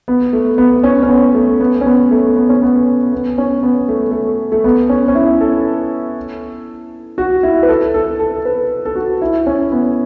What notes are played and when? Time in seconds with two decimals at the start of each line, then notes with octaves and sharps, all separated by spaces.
0.08 B3
0.33 A3
0.58 B3
0.84 C#4
1.03 C#4
1.09 B3
1.35 A3
1.60 B3
1.81 C#4
1.86 B3
2.11 A3
2.36 B3
2.49 C#4
2.62 B3
3.13 B3
3.38 C#4
3.63 B3
3.88 A3
4.11 A3
4.52 A3
4.64 B3
4.89 C#4
5.08 C#4
5.15 E4
5.41 A4
7.18 F#4
7.43 E4
7.63 B4
7.69 A4
7.94 A4
8.19 A4
8.45 B4
8.85 A4
8.95 F#4
9.22 E4
9.46 C#4
9.72 B3